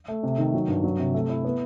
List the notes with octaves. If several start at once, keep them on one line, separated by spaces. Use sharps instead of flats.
A3
C3
D#3
F#3
G2
F#3
C3
A3
E4
B3